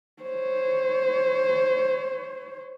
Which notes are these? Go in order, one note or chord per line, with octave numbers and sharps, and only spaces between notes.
C5 C#5